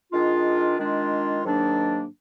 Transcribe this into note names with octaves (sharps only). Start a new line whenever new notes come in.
D#3 G#3 D4 F4
D#3 G#3 D4 F4
G#2 D#3 F#3 A#3 D4